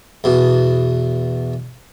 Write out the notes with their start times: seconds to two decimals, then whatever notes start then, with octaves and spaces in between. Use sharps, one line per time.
0.24 E2 B2